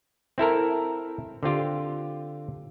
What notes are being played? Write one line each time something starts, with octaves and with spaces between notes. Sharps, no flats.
C4 E4 A4 A#4
D3 C4 F4 G4